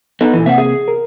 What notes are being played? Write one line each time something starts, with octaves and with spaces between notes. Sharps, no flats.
B3 D#4 A4
A#2 E3
C3 A#3 C4 E5 F#5
G#4
A#4